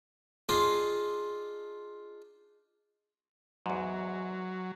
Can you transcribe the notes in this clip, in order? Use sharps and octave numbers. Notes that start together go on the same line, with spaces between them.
D4 D#4 F4 G#4 A#5 D6
E2 G#2 F#3